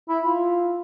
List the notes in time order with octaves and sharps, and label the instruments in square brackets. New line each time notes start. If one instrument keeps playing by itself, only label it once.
[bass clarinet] E4
F4